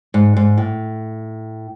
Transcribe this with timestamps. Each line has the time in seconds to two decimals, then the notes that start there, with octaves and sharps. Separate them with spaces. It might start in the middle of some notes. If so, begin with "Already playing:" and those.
0.14 G#2
0.37 G#2
0.58 A2